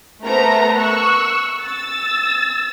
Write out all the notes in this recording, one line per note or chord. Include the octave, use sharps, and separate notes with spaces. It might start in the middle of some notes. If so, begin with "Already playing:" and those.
A3 B3 A#4 C5 A#5
C#6 E6 F#6
E6 A6